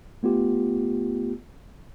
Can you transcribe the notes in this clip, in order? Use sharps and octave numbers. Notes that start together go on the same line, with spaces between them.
A3 B3 F4 G4